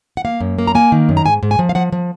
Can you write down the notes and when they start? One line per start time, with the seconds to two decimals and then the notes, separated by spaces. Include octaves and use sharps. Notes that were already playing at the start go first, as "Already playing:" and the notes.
0.17 F#5
0.25 A#3 F5
0.41 F#2
0.59 A#3
0.67 A#5
0.75 A#3 G#5
0.92 D#3
1.09 F#2
1.17 A#5
1.25 G#2 G#5
1.43 G#2
1.51 G#5
1.59 F3
1.69 F5
1.75 F3 F#5
1.92 F3